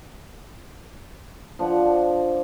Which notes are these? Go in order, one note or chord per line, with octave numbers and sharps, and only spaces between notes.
F3 D4 F#5